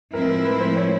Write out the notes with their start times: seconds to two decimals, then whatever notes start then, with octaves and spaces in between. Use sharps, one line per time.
0.13 A2 F3 G#3 C4 E4 A#4
0.29 A#4
0.45 B4
0.60 C5
0.76 C#5